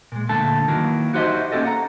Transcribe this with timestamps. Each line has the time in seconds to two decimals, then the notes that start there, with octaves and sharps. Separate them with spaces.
0.12 A#2 G#3
0.29 D2 A#2 D3 A3 A4 A5
0.68 D#3 E3 F#3 A#3
1.14 D#4 F#4 G4 C5 D#5 E5
1.52 A#3 C#4 D#4 G4 A4 D#5
1.65 F#5 A#5